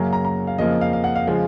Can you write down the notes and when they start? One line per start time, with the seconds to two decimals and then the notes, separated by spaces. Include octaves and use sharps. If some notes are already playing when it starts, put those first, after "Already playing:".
Already playing: F#2 C#3 F#3 A#3 A#5
0.13 A#5
0.25 A#5
0.47 F5
0.58 F2 C#3 F3 A#3 D#5
0.81 F5
0.93 F5
1.04 F#5
1.15 F5
1.27 C#3 F3 G#3